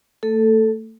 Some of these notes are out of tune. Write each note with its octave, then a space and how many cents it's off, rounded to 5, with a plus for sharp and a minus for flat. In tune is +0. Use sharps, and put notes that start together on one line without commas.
A3 +25 A4 +0